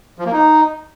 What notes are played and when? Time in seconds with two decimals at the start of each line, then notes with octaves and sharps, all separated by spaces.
0.19 F3
0.26 A#3
0.32 D#4